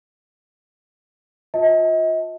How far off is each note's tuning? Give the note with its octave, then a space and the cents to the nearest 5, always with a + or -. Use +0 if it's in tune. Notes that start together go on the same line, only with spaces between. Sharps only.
F4 +35 D#5 +40 A5 +0